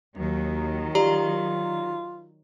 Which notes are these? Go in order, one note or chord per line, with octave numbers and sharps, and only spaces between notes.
D#2 D#3 F#3
F4 G4 D5 A#5